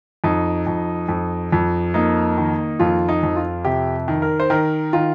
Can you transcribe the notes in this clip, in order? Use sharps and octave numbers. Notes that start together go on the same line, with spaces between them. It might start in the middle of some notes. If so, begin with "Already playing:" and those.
F2 D#4
F2
F2
F2
A#3 D#4
D#3
F2 F4
D#4
F2
F4
C3 G4
D#3
A#4
C5
D#3 A#4
D#3 F4